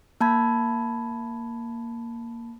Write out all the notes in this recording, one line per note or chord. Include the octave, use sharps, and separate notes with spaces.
A#3 A5 B5 G#6